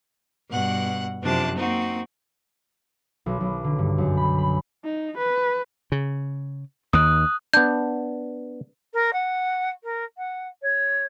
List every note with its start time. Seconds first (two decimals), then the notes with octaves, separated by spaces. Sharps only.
0.51 G2 B2 F#5 F#6
1.22 F#2 C3 F3 D4 A5 F#6
1.57 A#3 C4 D#4 F#4
3.26 B1
3.40 B1
3.64 D3
3.78 G2
3.98 F#2
4.17 B5
4.38 B5
4.85 D#4
5.18 B4
5.92 C#3
6.93 D#2 D#3 D#6 F#6
7.53 B3 D4 G6
8.94 A#4
9.13 F#5
9.84 A#4
10.18 F#5
10.62 C#5